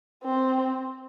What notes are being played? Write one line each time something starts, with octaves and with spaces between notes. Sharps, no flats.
C4